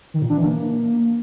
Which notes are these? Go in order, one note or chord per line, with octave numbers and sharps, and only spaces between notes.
D#3
A#2
D4
E3
A#3